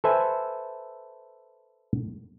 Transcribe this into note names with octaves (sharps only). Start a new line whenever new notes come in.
A4 B4 C5 E5 G#5